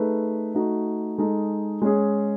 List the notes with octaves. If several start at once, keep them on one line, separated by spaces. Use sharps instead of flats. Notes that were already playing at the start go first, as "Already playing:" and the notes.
Already playing: A3 D#4 G#4 B4
A3 D#4 F#4
G#3 D#4 A4
G#3 C#4 G#4